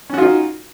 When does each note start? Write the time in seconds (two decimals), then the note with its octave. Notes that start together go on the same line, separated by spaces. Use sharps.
0.10 C#4
0.14 F#4
0.18 F4
0.22 D#4